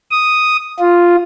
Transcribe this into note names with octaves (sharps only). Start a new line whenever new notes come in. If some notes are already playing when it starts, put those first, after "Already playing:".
D#6
F4